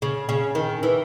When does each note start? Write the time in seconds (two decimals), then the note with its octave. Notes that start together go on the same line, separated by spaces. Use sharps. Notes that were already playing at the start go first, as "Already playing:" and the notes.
0.02 C#3
0.29 C#3
0.55 D#3
0.83 E3